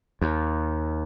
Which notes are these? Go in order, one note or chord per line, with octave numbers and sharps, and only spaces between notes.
D#2